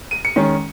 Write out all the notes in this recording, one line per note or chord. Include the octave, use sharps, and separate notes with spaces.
D#7
C#7
D#3 G#3 C#4